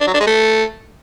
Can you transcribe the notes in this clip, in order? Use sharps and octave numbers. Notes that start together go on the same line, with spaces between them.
D4
F#3
D4
G#3
A3